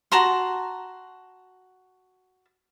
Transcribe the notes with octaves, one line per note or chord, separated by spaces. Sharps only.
F#4 A5 A#5 C6